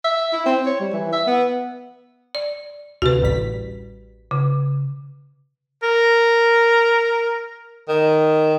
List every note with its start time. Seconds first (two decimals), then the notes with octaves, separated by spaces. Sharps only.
0.04 E5
0.33 E4
0.46 C4
0.66 C#5
0.80 G3
0.93 E3
1.12 E5
1.27 B3
2.35 D5
3.02 D2 C3 F#4 B4
3.22 A1 G3 B6
4.31 C#3
5.83 A#4
7.88 D#3